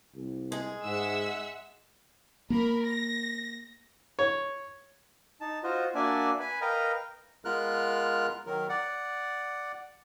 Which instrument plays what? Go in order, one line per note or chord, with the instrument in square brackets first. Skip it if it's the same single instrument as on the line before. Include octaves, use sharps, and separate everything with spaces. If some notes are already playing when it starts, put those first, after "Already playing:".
[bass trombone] C2
[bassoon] G#3 [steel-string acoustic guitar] G#4
[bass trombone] G#2 [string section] E5 F#5 E6
[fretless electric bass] A#3 [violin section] A#4 B5
[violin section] A#6
[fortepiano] C#5
[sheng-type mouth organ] D#4 A5
F4 F#4 C5 D#5
A#3 D4 F#4 D5 E5 G#5
B4 G#5 B5
A#4 B4 D#5 F5 G5 A#5
[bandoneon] G#3 B3 F4 A#4 F6 F#6
D#3 F#3 A#4
D5 F#5